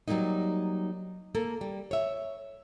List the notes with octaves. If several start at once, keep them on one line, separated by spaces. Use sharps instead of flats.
F#3 G3 A3 A#3 D#4
A#3 A4
G3
C#5 E5